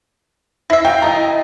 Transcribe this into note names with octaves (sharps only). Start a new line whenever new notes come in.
E4 E5 A#6 C7
F#3 F5 G5
A3 E4 D#5 A#5